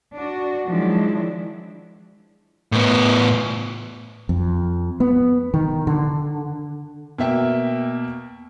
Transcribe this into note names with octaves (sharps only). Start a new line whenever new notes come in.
D4 F#4
D#3 F3 F#3 G#3 D4 E4
A2 B3
F2
B3
D#3
D3
B2 A#3 E5 G5